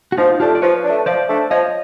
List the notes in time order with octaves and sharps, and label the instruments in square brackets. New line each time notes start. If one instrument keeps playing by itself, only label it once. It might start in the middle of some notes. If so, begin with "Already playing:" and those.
[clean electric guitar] F#4
[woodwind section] F3 [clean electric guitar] D#4 F4
[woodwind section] A3 D4 [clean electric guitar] F4 G4
[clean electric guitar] D5
[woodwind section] F3 [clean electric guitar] B4 C#5
[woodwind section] A3 D4
[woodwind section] F3 [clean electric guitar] C5 D5
[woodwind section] A3 D4
[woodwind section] F3 [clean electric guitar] C#5 D#5